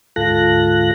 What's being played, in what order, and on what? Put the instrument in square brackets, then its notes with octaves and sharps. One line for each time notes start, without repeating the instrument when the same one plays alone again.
[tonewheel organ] D2 G#2 F4 A4 F#6 A#6